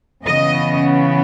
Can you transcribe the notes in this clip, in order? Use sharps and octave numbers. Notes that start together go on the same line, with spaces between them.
C#3 E3 B3 D#5